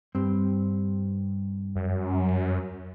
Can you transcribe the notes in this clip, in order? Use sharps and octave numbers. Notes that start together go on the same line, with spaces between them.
G2 C4
F#2